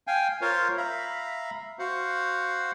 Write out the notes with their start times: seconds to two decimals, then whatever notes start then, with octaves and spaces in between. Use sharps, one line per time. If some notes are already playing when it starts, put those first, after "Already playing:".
0.07 F5 G5 G#5
0.41 F4 A#4 C5 C#5 F5
0.77 E5 F5 A#5 B5
1.79 F#4 C5 F5 F#5